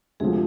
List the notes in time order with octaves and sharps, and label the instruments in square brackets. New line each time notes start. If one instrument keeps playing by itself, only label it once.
[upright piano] D2 C3 F3 [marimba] G#3 G#4